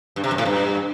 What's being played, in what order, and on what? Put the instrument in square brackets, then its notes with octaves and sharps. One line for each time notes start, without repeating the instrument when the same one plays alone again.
[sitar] G2
C3
F#2
A2
G2